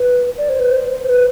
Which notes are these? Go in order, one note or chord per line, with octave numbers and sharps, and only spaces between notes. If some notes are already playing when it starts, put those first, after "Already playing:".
Already playing: B4
D5
C5
B4
C5
C5
B4